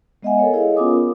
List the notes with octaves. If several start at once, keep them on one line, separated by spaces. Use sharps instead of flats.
G#3 B3 D#5 E5 F#5 G#5
A4 A#4 C#5
E4 G#4 C#5 D#5 F5
B3 C#4 F4 A#4 D6 D#6
A#4